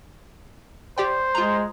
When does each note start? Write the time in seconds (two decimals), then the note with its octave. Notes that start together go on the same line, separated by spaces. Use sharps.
0.98 G4 C5 D5 G5
1.35 G#3 F4 A#5